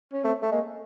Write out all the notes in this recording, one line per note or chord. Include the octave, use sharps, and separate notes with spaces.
C#4
A3 C4
A3
G#3 A#3